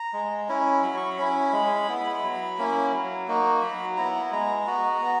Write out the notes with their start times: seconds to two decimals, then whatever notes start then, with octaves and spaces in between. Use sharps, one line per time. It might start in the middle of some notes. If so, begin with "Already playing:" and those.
Already playing: A#5
0.13 G#3
0.49 C#4 E4
0.83 F#3 B5
0.97 C#6
1.10 B5
1.18 C#4 E4
1.52 G#3
1.88 B3 E4
2.23 F#3
2.58 A#3 C#4 E4
2.92 F#3
3.28 A#3 D#4 F#4
3.62 F#3 B5
3.96 B3 E4 A#5
4.31 G#3 A#5
4.67 B3 F#4
5.02 B3